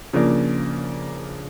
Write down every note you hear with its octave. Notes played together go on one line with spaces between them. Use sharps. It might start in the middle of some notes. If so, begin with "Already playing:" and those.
C#3 F3 A#3 D4